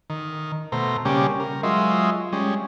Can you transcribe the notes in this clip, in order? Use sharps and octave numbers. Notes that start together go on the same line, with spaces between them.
D#3
B2 A3 C5 A#5
C#3 G3 A#3 C#4 G4 D6
A#4
F#3 G#3 F4 D#5 E5 C6
G3 G#3 C#4